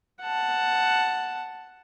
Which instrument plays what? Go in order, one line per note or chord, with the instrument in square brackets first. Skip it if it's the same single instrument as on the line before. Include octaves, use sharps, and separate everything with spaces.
[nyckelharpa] F#5 A5